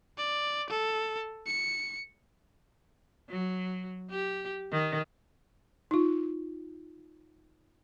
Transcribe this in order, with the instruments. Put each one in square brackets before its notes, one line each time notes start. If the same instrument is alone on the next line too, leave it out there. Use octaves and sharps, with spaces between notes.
[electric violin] D5
A4
C#7
[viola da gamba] F#3
G4
D#3
[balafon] D#4 F4